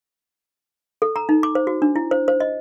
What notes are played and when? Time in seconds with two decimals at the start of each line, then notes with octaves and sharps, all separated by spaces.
1.02 A4
1.16 A#5
1.29 D#4
1.43 D6
1.55 C5
1.67 F#4
1.82 D4
1.96 E4
2.11 C5
2.28 C5
2.40 D#5